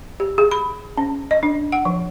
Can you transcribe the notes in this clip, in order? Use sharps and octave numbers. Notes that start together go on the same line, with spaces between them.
G4
G#4
B5
C#4
D#5
D4
F#5
F3